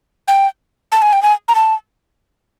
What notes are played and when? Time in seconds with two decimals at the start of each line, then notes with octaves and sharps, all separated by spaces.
0.28 G5
0.92 A5
1.02 G#5
1.13 G5
1.23 G#5
1.48 A#5
1.55 A5